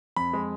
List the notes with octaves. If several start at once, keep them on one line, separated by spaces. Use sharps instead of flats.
F2 B5
G#3